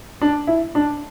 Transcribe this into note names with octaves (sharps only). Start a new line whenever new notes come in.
D4
E4
D4